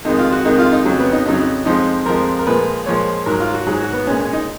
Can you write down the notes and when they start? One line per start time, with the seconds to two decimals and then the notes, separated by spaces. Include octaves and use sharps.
0.05 F2 D#3 G#3 D#4
0.19 F4
0.32 F#4
0.45 F2 D#3 G#3 D#4
0.59 F4
0.72 D#4
0.85 F2 C#3 F#3
0.99 B3
1.12 D#4
1.26 F2 C#3 F#3 D#4
1.40 D#4
1.65 F2 F3 G#3 D#4
2.06 F2 F3 G#3 A#4
2.39 A#4
2.46 A#2 F3 G#3 B4
2.86 A#2 F3 G#3 C#5
3.26 G#2 F#3 A#4
3.40 F4
3.54 F#4
3.66 G#2 F#3 G#4
3.80 F#4
3.93 B3
4.07 A#2 G#3 C#4
4.21 C#4
4.33 D#4